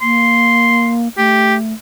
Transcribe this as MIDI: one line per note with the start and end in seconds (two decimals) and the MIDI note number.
0.02 1.08 58
0.02 0.93 84
1.17 1.74 57
1.17 1.55 67